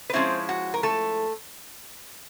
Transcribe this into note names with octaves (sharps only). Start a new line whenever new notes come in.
B4
F3 G#3 C4 C#4 E4 C5
F#4
A#4
A3 A4